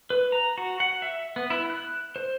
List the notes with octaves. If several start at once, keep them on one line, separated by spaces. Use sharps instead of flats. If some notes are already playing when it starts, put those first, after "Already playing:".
B4
A#5
F#4
F#5
E5
B3
E4
F#6
C5